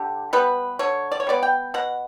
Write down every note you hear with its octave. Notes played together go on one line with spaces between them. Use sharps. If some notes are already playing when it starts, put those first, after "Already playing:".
Already playing: D3 G4
G3 B3 B4
D3 C#5
D5
C#5
G3 B3 D5
G5
B2 F#5